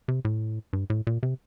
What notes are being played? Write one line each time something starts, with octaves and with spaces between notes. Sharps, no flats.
C3
A2
G2
A2
A#2
C3